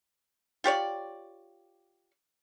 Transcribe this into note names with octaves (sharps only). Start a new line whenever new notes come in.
F4 G4 C#5 D5